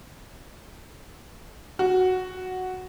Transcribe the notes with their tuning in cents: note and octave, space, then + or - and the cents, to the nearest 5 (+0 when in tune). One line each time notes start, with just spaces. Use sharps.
F#4 +0